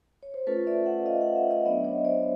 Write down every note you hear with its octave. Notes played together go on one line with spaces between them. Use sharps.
C#5
C5
A3 C#4 F4 A4 B4
D5 E5
E5 F#5
D#5 F5
E5 F#5
E5 F#5
D#5 F5
F#3 B3 D4 D5 E5
C#5 D#5
C5 D5